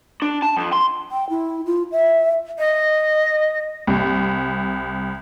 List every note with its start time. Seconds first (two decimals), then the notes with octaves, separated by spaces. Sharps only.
0.22 D4
0.42 A5
0.57 F2
0.73 C6
1.12 G5
1.30 E4
1.66 F4
1.92 E5
2.59 D#5
3.87 C2